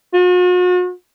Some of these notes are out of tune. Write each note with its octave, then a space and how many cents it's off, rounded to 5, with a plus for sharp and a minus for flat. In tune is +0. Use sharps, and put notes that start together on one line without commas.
F#4 -45